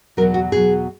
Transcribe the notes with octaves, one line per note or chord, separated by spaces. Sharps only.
E2 B2 F#3 A#4
F#4
E2 B2 F#3 G#4